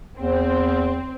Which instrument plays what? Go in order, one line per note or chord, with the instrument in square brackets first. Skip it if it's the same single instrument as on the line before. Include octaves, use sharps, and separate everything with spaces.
[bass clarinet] E2 [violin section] C4